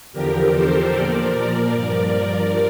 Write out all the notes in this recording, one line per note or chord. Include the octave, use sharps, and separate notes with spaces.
E2 D3 F3 G4 A#4
A4 C5
A#2 F3 A#4 D5
G2 F3 A#4 D5
A#4 D5